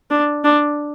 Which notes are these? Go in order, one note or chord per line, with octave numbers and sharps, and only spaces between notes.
D4
D4